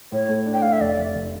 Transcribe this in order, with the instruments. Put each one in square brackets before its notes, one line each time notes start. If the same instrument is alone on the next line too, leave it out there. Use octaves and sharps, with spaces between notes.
[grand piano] A2 [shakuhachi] C#5
[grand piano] A3
D4
[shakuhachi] G5
[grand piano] A3 [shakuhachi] F5
[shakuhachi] E5
[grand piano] F1 [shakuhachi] D5
[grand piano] F1
F1